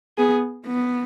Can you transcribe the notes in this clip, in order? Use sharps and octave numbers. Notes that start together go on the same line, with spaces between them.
B3 G#4
B3